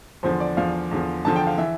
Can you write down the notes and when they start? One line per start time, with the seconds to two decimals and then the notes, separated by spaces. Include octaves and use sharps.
0.23 E2 D3 F3 C5
0.40 D5
0.57 E2 D3 F3 F5
0.91 E2 D3 F3
1.25 E2 D3 F3 A5
1.36 G5
1.47 F5
1.58 E3 E5